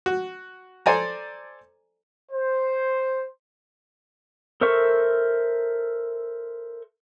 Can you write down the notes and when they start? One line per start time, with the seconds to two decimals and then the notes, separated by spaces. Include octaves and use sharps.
0.06 F#4
0.86 A4 C5 D5 G#5 A#5
2.32 C5
4.61 A4 A#4 C5 E5 C#6